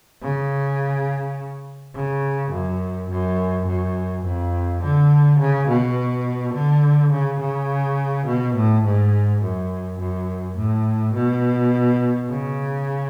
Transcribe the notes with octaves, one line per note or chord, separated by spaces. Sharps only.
C#3
C#3
F#2
F#2
F#2
F2
D3
C#3
B2
D3
C#3
C#3
B2
A2
G#2
F#2
F#2
A2
B2
C#3